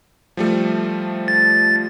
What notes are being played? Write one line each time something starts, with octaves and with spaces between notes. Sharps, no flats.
F3 G3 A3
A6